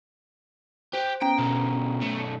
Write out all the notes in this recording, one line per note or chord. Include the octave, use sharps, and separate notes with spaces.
G4 C5
B3 C#4 G5 A#5
B2 D3
B1 A3